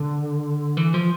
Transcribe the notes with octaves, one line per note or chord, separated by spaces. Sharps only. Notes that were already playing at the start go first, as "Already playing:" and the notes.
Already playing: D3
E3
F3